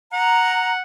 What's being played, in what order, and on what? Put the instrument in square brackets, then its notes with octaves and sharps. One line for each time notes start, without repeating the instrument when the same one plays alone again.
[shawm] F#5 [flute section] A#5